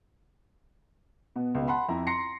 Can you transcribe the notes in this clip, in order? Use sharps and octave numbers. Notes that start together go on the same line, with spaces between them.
B2 B3
C#2 B2
F#5 A5 B5 C6
F2 E4 A#5
A#5 C6 A#6 C7 C#7